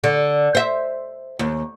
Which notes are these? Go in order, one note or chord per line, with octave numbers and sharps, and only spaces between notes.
D3
C5 E5
D#2